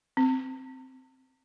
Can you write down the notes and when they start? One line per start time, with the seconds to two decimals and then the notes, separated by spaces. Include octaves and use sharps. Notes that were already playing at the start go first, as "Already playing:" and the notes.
0.17 C4